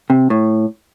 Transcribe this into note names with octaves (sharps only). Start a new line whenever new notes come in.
C3
A2